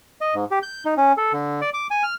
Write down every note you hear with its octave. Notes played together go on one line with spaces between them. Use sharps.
D#5
G#2
G4
G6
D#4
C#4
A4
D3
D5
D6
G#5
F6